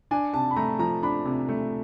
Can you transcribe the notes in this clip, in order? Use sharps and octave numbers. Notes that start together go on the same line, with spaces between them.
D4 G#5
C3 A5
B5
A3 A#5
F3 A#5
D4 B5
C3
A3